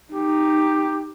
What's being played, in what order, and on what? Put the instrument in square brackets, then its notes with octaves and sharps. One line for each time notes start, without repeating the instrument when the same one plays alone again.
[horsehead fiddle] D#4 [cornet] G4